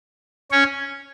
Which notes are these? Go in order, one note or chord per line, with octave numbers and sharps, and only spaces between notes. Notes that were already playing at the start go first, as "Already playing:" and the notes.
C#4 C#5